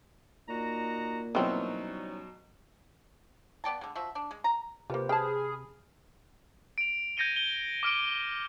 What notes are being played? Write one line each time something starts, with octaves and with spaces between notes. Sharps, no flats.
A#2 D#4 F#4 A#5
B2 E3 F#3 G3 C4 C#4 D#4
B3 D5 G5 A5
D3 G#3
F3 F#4 E5
D4
G#3
A#5
C3 A#3 F4 G4 B4 C5
G#4 G5 A5 B5 F6
D7 F7
G6 G#6 A#6 C#7 D#7 G7
G7
D6 F6 D7